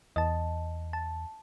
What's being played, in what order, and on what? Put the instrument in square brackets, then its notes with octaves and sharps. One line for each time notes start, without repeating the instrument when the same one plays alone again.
[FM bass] E2 [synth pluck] D#5 A5
[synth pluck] A5